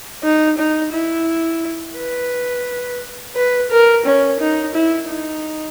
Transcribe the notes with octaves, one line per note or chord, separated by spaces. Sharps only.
D#4
D#4
E4
B4
B4
A#4
C#4
D#4
E4
D#4